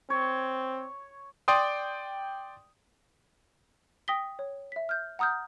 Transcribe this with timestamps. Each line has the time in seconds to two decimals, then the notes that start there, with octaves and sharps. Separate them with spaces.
0.10 C4 C#5
1.48 D5 G5 C6 D#6
4.08 G5 D#6 A#6 B6 G7
4.39 C#5
4.72 E5 B6
4.89 F6 G6
5.19 F#5 A#5 D#6 F6 G6